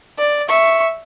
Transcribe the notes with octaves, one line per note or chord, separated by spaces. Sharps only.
D5
E5 C#6